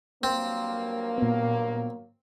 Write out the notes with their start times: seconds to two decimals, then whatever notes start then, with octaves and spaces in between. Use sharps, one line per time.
0.23 G2 F#3 A#3 C4
1.18 A#2 B3